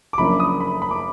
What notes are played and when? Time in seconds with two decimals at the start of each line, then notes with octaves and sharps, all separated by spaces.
0.13 D6
0.18 F#1 F#2 F3 A#3 D4 B5
0.40 D#6
0.60 B5
0.82 B5
0.91 D6